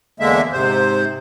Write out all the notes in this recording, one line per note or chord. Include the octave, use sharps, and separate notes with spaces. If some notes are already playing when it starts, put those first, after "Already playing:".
E2 D3 G#3 A#3 E5
G#2 C3 C5